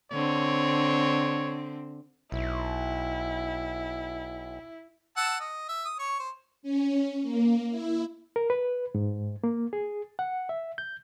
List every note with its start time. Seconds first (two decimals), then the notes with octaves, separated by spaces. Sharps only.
0.12 D3 C4 C#5
2.32 B1 E4
5.17 F#5 A5 E6
5.40 D#5
5.69 E5
5.85 D#6
5.99 C#5 C#6
6.19 C5
6.63 C#4
7.22 A#3
7.71 E4
8.36 A#4
8.50 B4
8.95 G#2
9.44 A#3
9.73 G#4
10.19 F#5
10.49 E5
10.78 G6